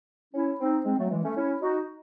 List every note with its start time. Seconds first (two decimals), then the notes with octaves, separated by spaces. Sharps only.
0.34 C#4 E4
0.60 C4 D#4
0.85 G#3 C4
0.98 F#3 A3
1.11 E3 G#3
1.23 A3 C#4
1.36 C#4 E4
1.61 D#4 F#4